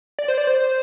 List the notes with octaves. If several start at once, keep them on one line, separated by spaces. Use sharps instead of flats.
D5
C5
D5
C5